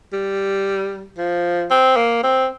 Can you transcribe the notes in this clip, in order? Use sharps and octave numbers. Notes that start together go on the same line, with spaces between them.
G3
F3
C4
A#3
C4